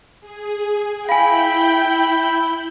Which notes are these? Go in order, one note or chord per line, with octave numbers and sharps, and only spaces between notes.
G#4
E4 F5 G5 G#5 B5 G6